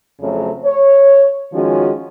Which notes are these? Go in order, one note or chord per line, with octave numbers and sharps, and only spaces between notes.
F2 C#3 F#3 A3 C4
C#5
D#3 F3 G#3 C#4 F#4